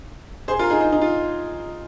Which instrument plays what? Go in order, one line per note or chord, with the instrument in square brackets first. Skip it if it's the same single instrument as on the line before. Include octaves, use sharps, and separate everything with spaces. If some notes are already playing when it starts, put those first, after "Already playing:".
[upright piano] G#4 C5
F4 A#4
D#4 G#4
D#4
D#4
F4